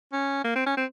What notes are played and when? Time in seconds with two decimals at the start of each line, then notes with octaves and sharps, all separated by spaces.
0.13 C#4
0.45 A#3
0.56 C4
0.66 C#4
0.77 C4